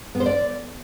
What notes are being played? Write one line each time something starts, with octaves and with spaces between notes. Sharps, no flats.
B3
C5
D5